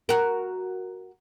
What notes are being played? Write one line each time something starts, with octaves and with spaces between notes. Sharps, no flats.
F#4 A#4